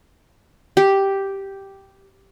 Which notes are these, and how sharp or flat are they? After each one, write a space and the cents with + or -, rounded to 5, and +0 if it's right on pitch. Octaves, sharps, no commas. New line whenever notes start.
G4 -5